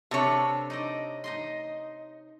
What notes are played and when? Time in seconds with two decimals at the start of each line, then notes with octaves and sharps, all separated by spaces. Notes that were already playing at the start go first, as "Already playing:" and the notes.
0.11 C3 D4 A4 B4 C#5
0.70 D#4 D5 D#5
1.24 D#4 D#5 C6